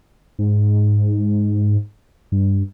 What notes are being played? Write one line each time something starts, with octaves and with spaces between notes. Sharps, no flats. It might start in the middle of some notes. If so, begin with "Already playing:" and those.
G#2
G2